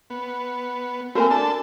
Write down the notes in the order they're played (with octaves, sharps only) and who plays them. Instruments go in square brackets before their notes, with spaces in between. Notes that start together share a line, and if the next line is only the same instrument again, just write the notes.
[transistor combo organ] B3
[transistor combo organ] A3 A#3 C4 [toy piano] F#4 A#4 G#5
[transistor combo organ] D4 A4 A5